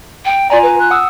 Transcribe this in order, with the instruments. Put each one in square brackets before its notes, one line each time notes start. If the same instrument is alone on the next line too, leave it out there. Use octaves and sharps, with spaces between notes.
[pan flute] G5
[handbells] F4 G#5 A#5 [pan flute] D5
[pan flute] B4
F#6
[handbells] F#5 D#6 E6